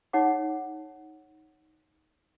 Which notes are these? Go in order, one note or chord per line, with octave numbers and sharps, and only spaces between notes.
D#4 G#4 C#5 F#5 D6